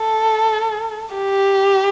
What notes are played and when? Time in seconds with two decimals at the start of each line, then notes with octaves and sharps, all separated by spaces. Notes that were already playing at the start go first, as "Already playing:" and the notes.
Already playing: A4
1.15 G4